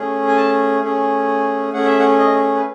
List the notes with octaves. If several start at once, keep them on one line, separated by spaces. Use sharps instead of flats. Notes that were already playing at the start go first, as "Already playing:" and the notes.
Already playing: A3 C#4 G#4
G#5
A5
A3 C#4 G#4
A3 C#4 G#4 F#5
E5
F#5
D#5
B4